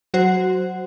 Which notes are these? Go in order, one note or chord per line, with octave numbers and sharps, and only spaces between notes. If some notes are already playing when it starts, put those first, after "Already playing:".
F#3 F#4 C5